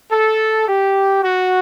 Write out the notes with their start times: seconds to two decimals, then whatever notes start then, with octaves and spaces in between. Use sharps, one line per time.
0.12 A4
0.67 G4
1.23 F#4